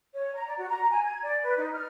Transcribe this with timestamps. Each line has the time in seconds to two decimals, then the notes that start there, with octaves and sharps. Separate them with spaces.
0.14 C#5
0.34 A#5
0.46 D5
0.58 F#4
0.69 A#5
0.90 G#5
1.04 G#6
1.22 D5
1.43 B4
1.57 D#4
1.73 F6